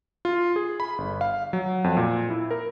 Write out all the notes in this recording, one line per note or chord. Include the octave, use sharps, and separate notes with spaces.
F4
G#4
B5
G1
F5
F#3
F2
A#2
E4
A#4